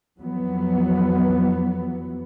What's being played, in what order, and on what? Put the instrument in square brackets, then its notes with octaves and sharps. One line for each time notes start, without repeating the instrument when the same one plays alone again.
[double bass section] F2 E3 F#3 B3